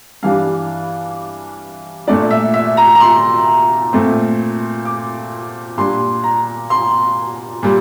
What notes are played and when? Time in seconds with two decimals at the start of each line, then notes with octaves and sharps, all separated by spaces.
0.23 G2 E3 G3 D4 F5
2.07 A#2 A3 D4 D5
2.31 E5
2.54 E5
2.77 A#5
2.95 A#5
3.00 C6
3.93 A#2 A3 C4
4.85 D6
5.78 A#2 G3 D4 C6
6.24 A#5
6.70 C6
7.63 A#2 G3